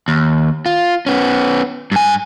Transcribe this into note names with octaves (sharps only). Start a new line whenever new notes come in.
D#2
F4
B3 C#4
G2 G#5